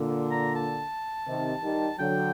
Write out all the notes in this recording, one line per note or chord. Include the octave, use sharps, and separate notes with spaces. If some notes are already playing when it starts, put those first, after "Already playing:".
Already playing: A#2 D3
A#5
A5
C3 D#3
D#3 G3
D3 F#3 G5